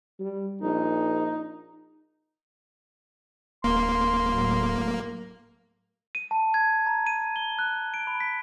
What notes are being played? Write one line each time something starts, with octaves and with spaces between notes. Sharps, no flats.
G3
A#1 D#4
D1 A#3 C6
A2 F#3
D#7
A5
G#6
A#5
D#7
G7
F#6
D7
B5
B6